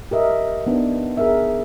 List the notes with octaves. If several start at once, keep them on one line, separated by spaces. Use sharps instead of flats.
G4 A#4 D#5 E5
B3 D4 D#4
G#4 A#4 E5